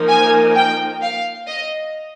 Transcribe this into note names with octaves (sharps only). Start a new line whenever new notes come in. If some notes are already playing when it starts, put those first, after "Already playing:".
Already playing: F3 A#3 D#4 A#4
G#5
G5
F5
D#5